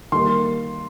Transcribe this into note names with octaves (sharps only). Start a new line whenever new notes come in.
D#3 G3 A#3 C6